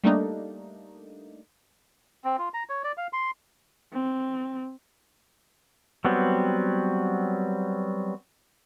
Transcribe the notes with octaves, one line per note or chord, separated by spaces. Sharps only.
G3 A3 A#3 D4 D#4
C4
F4
A#5
C#5
D5
F5
C6
C4
F#3 G3 B3 C4